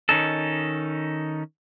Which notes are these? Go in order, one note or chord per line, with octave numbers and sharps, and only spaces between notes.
D#3 C#4 D#4 A4